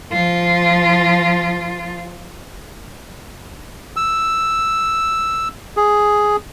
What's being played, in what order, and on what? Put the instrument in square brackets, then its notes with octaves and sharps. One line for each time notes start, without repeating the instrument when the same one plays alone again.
[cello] F3 F4
[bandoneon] E6
G#4